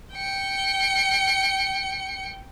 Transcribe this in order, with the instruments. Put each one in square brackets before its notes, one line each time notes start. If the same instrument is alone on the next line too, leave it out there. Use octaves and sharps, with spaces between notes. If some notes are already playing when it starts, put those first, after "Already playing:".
[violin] G5 C#7